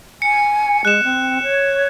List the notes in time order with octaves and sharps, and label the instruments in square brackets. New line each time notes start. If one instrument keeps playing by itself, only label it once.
[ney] G#5 [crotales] C#7
[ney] G#3 [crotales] F#6 E7
[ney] C4
C#5